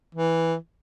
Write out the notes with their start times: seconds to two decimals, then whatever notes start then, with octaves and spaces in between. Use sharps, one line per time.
0.15 E3